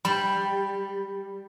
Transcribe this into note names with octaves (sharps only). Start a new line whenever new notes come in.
G3 B5